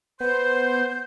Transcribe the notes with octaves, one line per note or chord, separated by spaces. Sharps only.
B3 C5 G6